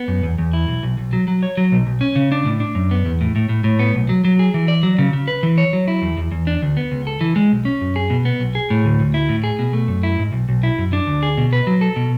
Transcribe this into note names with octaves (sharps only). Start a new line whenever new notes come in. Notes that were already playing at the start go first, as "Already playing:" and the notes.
Already playing: B3
F#2
E2
E2
E4
B1
B1
B1
F#3
F#3
C#5
F#3
B1
B1
C#4
C#3
D4
A2
D4
F#2
B3
E2
A2
A2
A2
A2
B3
B1
F#3
F#3
G#4
E3
D5
F#3
C#3
C#3
B4
E3
C#5
F#3
E4
E2
E2
E2
D4
D2
B3
C#2
A4
E3
G#3
B1
C#4
F#2
G#4
B2
B3
B1
G#4
A2
D2
D2
E4
A2
G#4
B2
A3
F#2
E4
G#2
B1
B1
E4
F#2
D4
D2
G#4
B2
B4
F#3
A4
B2